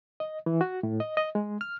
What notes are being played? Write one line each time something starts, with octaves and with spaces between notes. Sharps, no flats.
D#5
E3
F#4
A2
D#5
D#5
G#3
F6